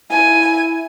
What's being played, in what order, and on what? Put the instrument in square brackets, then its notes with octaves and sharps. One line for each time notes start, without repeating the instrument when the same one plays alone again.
[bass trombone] E4 [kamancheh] G#5